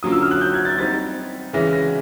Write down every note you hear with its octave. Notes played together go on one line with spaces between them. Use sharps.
D3 F#3 A#3 C#4 F4 D#6
E6
F6
F#6
G6
G#6
A6
G3 C4 D#4 A6
C#3 E3 G#3 C#4 E4 A#6
A#6